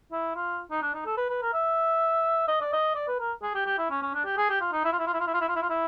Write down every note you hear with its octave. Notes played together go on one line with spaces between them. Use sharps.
E4
F4
D#4
D4
D#4
A4
B4
B4
A#4
E5
D#5
D5
D#5
D5
B4
A#4
G#4
G4
G4
E4
C#4
C#4
D4
G4
G#4
G4
F4
D#4
E4
F4
E4
F4
E4
F4
E4
F4
E4
F4
E4
F4
E4